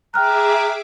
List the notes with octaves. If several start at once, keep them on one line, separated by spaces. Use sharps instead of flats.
G#4 E5 G5 A#5 D6 F6 F#6